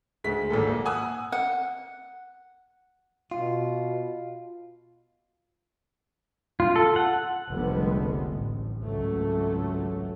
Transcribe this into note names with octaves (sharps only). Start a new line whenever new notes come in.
D2 G#3 B6
G#1 A#2 A4
A#3
F#5 G#5 D#6 E6 F#6
F#5
B2 F4
F4
A4
F#5
F1 C2 D3 G3 G#3 B3
A1
G#1 C#2 F#3 A3